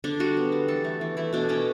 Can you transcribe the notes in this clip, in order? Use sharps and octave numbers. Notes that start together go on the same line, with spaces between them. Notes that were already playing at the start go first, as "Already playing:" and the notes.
D3 D4
G3 F#4
B3
G3
E3 A4
A3
E3
A3 E4
B2 D4
B2 C#4